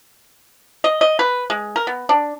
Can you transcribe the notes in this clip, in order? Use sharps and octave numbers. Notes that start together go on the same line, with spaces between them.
D#5
D#5
B4
G#3
A#4
B3
D4